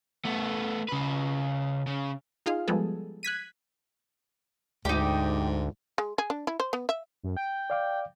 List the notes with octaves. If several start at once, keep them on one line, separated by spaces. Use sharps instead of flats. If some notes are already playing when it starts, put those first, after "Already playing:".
A3 B3
C#3 B4
C#3
D#4 F4 G#4 F5
F3 G3 G#3 B3 G#4 A4
F#6 G#6 B6 D#7
D2 G#2 D#4 G4
G#3
G#4
D4
E4
C5
B3
E5
F#2
G5
D5 F5 D6